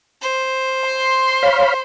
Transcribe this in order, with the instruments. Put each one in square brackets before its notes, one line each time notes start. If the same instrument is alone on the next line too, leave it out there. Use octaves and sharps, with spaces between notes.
[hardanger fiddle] C5
[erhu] C6
[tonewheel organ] C#5 F5 B5